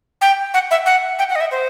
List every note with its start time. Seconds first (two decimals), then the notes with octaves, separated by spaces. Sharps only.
0.21 G5
0.54 F#5
0.71 E5
0.86 F#5
1.19 G5
1.29 F#5
1.35 D#5
1.40 E5
1.51 C5